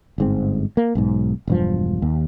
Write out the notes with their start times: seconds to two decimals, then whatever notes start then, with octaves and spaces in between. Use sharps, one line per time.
0.18 G1 G#2 C4
0.77 A#3
0.95 B1 G#2
1.48 E1 G2 F3
2.02 D#2